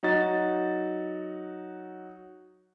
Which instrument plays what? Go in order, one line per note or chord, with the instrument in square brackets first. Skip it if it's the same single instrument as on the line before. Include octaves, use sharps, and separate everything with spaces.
[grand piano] F#3 D#4 F#4 A6